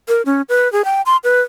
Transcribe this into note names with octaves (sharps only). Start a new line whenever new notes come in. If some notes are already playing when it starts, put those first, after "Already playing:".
A#4
C#4
B4
G#4
G5
C6
B4